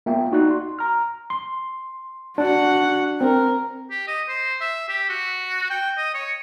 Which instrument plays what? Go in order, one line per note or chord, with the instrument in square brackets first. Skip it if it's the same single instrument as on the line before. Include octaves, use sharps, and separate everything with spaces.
[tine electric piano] A#3 B3 F4 E5 G5
D#4 F#4 D5 F#6
C6
A#5 F6
C6
[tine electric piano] D4 [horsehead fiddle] F#4 F#5
[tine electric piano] C4 [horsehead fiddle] A#4
[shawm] G4
D#5
C5
E5
G4
F#4
G5
D#5
C#5